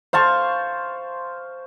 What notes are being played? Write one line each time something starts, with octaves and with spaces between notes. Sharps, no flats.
C5 F5 A5 C#6